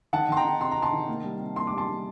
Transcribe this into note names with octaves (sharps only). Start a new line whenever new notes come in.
D#3 F#5 A5
D#3 C6
G5 A#5
D#3
C3 C6
C3 A#5
A5 C6
D#3
A#3
G3
C3
A#3 C6
G3 D6
A5 C6
G3